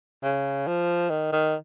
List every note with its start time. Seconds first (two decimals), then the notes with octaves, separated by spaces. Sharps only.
0.23 C#3
0.67 F3
1.10 D#3
1.32 D#3